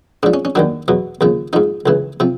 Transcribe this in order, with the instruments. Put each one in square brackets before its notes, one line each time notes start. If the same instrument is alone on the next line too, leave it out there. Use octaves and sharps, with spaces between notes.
[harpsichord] G#2 D4
F3
C#4
C#4
D#2 D#3 F#3 D4
E2 B2 F#3
D#2 C#3 F3
G#2 F3 D#4
C#2 C#3 E3
C3 F3